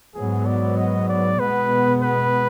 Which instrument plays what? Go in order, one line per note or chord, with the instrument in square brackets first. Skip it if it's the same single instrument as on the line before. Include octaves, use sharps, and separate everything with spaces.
[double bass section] G#2 F#3 B3 [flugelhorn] G#4
[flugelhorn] D5
D#5
D5
[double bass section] B2 G#3 B3 [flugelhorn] B4
[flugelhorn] B4